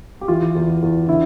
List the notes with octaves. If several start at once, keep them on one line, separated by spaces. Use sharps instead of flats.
G4
E3 F4
E2
E2
D3 E4